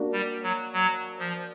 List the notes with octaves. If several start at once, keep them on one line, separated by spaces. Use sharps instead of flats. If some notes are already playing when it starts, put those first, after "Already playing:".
Already playing: A#3 D4 F#4
G3
F#3
F#3
F3